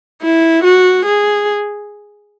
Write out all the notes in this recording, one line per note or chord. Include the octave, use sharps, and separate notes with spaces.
E4
F#4
G#4